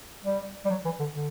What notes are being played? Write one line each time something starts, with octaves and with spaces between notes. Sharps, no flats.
G3
G3
F#3
E3
D3
D3